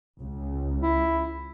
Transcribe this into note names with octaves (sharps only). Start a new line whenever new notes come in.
C#2
E4